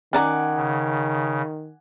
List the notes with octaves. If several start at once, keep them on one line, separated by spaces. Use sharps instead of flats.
D#3 C#4 D5 F#5 G#5 A#5 D6
C#3